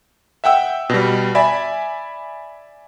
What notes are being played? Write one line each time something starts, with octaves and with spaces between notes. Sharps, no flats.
E5 F#5 G5 E6
B2 G3
D5 E5 G#5 B5